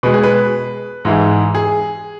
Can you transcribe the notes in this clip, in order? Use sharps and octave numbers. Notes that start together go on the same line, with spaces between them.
B2 G#3 B4
G#4
B4
G#2 E3 G#3
G#4